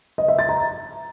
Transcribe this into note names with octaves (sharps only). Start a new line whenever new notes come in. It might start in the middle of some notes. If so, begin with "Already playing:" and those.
D#5
E5
A6
A#5